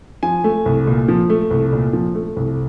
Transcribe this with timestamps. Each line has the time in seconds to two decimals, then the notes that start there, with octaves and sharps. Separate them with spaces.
0.23 F3 G#5
0.44 A3
0.66 C2
0.87 A#2
1.08 F3
1.30 A3
1.51 C2
1.72 A#2
1.93 F3
2.15 A3
2.36 C2